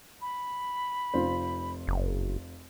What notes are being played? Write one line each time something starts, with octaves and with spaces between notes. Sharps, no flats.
B5
F1 F4 C5
F#1